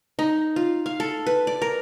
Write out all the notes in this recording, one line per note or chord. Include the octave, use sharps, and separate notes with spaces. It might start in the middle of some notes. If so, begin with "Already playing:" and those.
D#4
F4
F5
A4
B4
D5
A#4